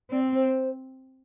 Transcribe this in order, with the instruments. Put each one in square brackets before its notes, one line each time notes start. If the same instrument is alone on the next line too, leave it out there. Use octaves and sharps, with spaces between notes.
[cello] C4 [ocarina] D5
[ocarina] C5